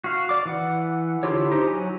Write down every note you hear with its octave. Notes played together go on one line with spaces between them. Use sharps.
F#4 F5
D5 D6
E3 F#5
D3 E4 F4 G4 C#5
D#4 G4 C5
F#3 G#5